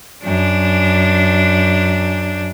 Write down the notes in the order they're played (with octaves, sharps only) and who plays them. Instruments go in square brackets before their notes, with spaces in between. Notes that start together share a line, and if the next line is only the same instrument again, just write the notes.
[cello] F#2 D4